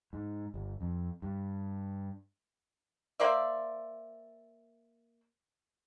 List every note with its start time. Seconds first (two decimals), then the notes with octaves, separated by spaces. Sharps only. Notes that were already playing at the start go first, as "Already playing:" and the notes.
0.13 G#2
0.54 G1
0.81 F2
1.22 G2
3.20 A#3 C5 D5 E5